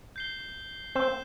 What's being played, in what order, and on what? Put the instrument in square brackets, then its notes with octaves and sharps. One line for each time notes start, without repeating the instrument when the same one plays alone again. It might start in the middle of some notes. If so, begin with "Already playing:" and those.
[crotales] G6 C7 G7
[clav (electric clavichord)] C4 [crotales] G6 C7 E7 G7